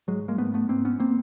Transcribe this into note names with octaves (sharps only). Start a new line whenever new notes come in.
G#2 F#3 G#3
G#3 A#3
G#2 A3 B3
A3 B3
G#2 A#3 C4
B3 C#4
A#3 C4